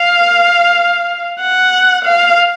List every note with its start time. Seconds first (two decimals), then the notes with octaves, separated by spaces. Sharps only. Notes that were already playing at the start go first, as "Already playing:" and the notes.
Already playing: F5
1.40 F#5
2.04 F5